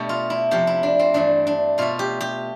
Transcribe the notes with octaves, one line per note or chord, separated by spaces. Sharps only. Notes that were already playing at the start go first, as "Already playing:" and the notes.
Already playing: B2 A3 D4 G4
F4
E4
F2 C3 F3 G4
E4
D4
C4
G2 E3 A3 D4
D4
B2 A3 F4
G4
G4